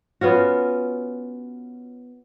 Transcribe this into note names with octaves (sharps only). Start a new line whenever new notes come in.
B3 C#4 F4 F#4